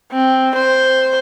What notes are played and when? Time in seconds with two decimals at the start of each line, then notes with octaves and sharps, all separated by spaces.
0.12 C4
0.55 C5